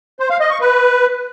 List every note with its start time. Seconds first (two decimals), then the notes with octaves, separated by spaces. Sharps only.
0.20 C5
0.30 F5
0.40 D#5
0.51 C#6
0.61 B4